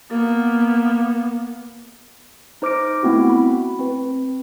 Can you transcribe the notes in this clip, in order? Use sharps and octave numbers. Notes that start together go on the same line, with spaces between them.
A#3 B3
D#4 C5 D6 F6 A#6 D7
A3 B3 C4 E4 F#4
B5
C4 B4